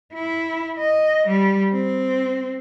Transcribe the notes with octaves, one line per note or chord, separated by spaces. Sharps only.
E4
D#5
G3
C4